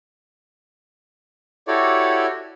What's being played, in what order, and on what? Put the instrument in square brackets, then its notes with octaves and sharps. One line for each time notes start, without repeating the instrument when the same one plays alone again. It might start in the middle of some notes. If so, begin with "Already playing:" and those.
[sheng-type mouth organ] E4 F#4 G4 A4 C#5 D5